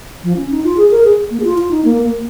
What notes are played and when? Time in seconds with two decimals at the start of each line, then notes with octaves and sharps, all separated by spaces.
0.24 F3
0.37 C#4
0.51 D#4
0.64 F4
0.77 G#4
0.91 A#4
1.04 G#4
1.31 A#3
1.40 G#4
1.44 F4
1.58 F4
1.71 D#4
1.85 A#3
2.02 A#3